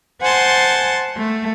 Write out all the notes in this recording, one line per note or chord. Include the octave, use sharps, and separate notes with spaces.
C5 F#5 G#5 A5 C6
A3